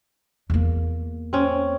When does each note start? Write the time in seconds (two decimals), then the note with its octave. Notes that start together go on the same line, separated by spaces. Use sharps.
0.50 E2 A#3
1.33 C4 C#4